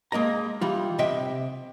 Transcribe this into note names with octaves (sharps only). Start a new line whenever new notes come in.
G#3 A#3 D#5 A#5
E3 G3 F4
C3 D#5 E5 G5